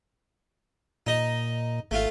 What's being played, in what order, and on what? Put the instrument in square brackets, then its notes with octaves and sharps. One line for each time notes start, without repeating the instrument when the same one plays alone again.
[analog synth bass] A#2 [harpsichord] D#4 D#5
[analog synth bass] G#1 [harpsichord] A3 F4